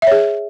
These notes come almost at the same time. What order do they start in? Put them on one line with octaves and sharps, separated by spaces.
E5 C#5 G#4